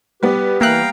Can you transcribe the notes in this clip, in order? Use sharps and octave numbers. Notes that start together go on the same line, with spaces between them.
G3 B3 G4 B4
E3 A#3 E5 F5 G5 A#5 F#6